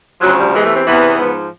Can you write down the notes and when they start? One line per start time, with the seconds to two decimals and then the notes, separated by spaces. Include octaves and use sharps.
0.21 D2 C#3 F3 F#3
0.38 G3
0.54 E2 C3 E3 G#3
0.64 A3
0.75 C4
0.86 E2 C3 E3 B3
1.19 G#2 F3